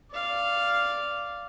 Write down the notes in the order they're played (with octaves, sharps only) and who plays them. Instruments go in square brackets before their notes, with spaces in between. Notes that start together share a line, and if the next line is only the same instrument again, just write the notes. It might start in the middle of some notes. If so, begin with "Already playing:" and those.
[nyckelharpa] D5 F5